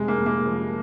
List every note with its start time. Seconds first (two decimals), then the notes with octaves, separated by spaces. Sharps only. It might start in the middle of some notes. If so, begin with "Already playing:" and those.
Already playing: F1 C3 G#3
0.08 A#3
0.17 F2
0.26 A#3
0.46 F3